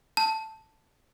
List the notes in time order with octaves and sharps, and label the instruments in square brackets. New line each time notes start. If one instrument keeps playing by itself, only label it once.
[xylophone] A5